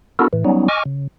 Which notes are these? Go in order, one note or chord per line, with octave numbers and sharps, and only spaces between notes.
B3 D4 E4 F#4 A4 A#4
A2 E3
F#3 G3 B3 C#4 D#4
D#5 G#5 C#6 D6 F6
C#3